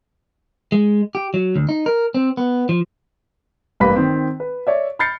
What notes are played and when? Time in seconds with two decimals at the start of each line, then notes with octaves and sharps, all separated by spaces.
0.72 G#3
1.15 G4
1.34 F#3
1.56 D2
1.69 D#4
1.86 A#4
2.14 C4
2.37 B3
2.69 F3
3.80 A1 G2 A#3 B4 B5 B6
3.96 D#3 C4
4.40 B4
4.67 C#5 D5 E5
4.99 B5 F6 G6 A6 C7 C#7